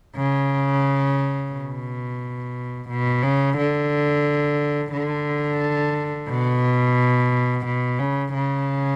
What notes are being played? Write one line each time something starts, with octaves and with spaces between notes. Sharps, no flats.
C#3
B2
B2
C#3
D3
D3
B2
B2
C#3
C#3